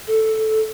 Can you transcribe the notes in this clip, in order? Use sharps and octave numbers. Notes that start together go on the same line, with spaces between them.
A4